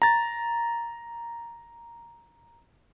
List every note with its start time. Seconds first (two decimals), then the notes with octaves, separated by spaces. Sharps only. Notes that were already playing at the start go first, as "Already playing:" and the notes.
0.02 A#5 A6